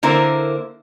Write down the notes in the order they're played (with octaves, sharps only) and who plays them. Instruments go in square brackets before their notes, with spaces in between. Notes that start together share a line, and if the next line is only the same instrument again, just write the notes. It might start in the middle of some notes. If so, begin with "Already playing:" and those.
[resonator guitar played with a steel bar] D3 A#3 E4 A#4 C5